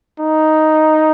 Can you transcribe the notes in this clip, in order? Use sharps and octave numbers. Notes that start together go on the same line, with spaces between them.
D#4